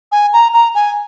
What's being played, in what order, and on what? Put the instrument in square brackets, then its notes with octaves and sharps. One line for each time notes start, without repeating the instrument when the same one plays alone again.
[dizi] G#5
A#5
A#5
G#5